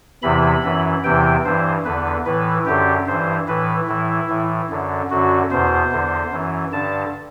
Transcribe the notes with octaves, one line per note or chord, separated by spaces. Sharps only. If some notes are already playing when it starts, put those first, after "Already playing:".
E2 C3 E3 B5
F#2 E3
E2 C3 E3 G5
G2 E3 C5
E2 D3 B4
A2 E3 B4
F#2 D3 G4
G2 E3 C5
A2 E3 B4
A2 E3 E4
A2 E3
F#2 D3
F#2 D3 F#4
E2 B2 C5
E2 D3
F#2 E3
G2 D3 A5